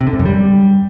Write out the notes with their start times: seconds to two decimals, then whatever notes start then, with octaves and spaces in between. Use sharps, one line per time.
0.01 C3
0.07 D3
0.13 G#2
0.19 F#2
0.26 G3